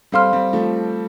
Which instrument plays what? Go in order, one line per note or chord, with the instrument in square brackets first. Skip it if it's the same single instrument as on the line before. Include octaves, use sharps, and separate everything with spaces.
[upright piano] G3 C4 [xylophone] A4 F5 C6 F6
[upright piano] G3 C4
F3 A3